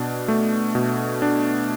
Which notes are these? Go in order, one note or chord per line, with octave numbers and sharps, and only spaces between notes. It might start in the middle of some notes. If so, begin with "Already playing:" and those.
Already playing: B2 D4
A3
B2
D4